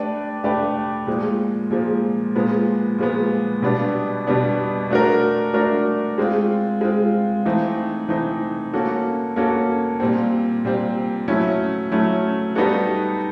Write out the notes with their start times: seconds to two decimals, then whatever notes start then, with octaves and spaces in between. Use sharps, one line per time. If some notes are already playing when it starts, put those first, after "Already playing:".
Already playing: A3 D4 G4 B4 D5
0.44 A3 D4 G4 B4 D5
1.07 A#2 F3 G#3
1.71 A#2 F3 G#3
2.36 A#2 F3 G#3 B3
2.98 A#2 F3 G#3 B3
3.62 B2 G3 B3 D4
4.27 B2 G3 B3 D4
4.90 A3 D4 F#4 A#4
5.54 A3 D4 F#4 A#4
6.18 G#3 C4 F4
6.81 G#3 C4 F4
7.45 E3 A3 C4 D#4
8.08 E3 A3 C4 D#4
8.73 A#3 C#4 F#4 A4
9.36 A#3 C#4 F#4 A4
10.00 A#2 G3 C4
10.65 A#2 G3 C4
11.28 F#3 A3 C#4 E4
11.92 F#3 A3 C#4 E4
12.55 G3 B3 D#4 F#4 A4